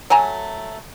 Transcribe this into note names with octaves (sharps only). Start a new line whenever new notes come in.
F#3 A3 G#5 A#5